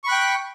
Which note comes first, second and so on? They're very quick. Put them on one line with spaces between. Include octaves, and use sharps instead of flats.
C#6 B5 F#6 G5